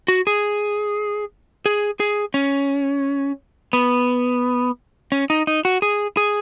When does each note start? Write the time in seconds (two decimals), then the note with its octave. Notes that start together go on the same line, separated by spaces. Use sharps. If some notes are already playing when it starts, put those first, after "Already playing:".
0.08 F#4
0.27 G#4
1.66 G#4
2.00 G#4
2.34 C#4
3.73 B3
5.12 C#4
5.30 D#4
5.47 D#4
5.65 F#4
5.82 G#4
6.17 G#4